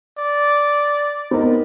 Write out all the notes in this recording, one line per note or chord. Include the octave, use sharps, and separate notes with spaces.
D5
B3 C4 D#4 A#4